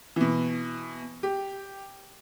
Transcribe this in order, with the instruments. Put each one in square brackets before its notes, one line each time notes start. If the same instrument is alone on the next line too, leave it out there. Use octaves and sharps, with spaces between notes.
[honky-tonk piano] B2 E3
G4